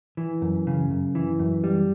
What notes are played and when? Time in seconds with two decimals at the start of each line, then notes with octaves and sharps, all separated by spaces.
0.17 E3
0.42 F#2
0.67 C#3
0.91 F#2
1.15 E3
1.39 F#2
1.64 G3